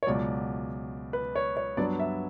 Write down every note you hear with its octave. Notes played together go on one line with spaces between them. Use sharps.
C#5
C#2 B2 F#3 D5
B4
C#5
C#5
G2 F#3 B3 D4 D5
E5